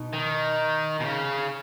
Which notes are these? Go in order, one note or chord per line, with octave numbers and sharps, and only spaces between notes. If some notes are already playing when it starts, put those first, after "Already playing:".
Already playing: B2 D#4
D#3
B2
C#3